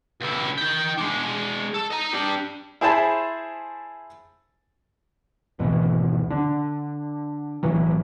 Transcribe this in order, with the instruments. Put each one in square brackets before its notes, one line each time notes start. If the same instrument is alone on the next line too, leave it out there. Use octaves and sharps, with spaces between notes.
[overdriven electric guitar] C#2 E4
D#4 G5
G#3 D4
A4
D#5 A#5
D4 G4
[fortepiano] E4 G#4 C5 A5 B5
[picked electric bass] G#1 D2 B2 E3
D3 D4
B1 A2 E3 F#3